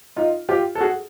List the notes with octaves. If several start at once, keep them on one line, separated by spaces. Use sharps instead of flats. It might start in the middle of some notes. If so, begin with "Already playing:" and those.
D#4 F4
F4 G4
A4
F#4 G#4